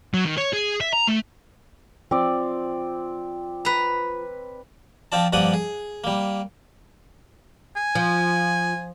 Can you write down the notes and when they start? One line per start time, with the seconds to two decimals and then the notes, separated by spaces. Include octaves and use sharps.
0.14 F#3
0.26 D#3
0.38 C#5
0.54 G#4
0.81 E5
0.93 A#5
1.07 A3
2.11 F3 C4 D5
3.65 B4 A#5
5.12 F3 C4 F4 D5 A5
5.33 G2 F3 A#3 D5 F#5 D#6
5.54 G#4
6.04 G3 A#3
7.76 G#5
7.95 F3